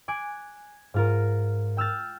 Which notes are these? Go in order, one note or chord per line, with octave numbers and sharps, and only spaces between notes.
G#5 D6 F#6 D7
G#2 F4 A#4
G5 E6 F6 A6